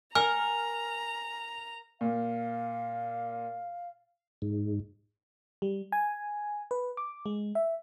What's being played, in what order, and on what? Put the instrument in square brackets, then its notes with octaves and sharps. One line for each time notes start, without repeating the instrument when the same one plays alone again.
[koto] A#4 [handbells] G#5 [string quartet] A#5 [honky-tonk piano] F6
[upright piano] A#2 [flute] F5
[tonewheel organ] G#2
[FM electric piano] G3
G#5
B4
D6
G#3
E5